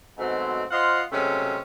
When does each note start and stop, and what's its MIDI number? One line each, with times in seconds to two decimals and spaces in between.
0.18 0.63 44
0.18 0.63 47
0.18 0.63 54
0.18 0.63 57
0.18 0.63 60
0.71 1.01 65
0.71 1.01 72
0.71 1.01 75
0.71 1.01 77
0.71 1.01 78
0.71 1.01 84
1.12 1.58 48
1.12 1.58 54
1.12 1.58 56
1.12 1.58 57
1.12 1.58 61